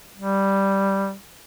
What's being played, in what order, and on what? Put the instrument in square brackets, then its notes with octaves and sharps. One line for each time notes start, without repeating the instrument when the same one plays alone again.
[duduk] G3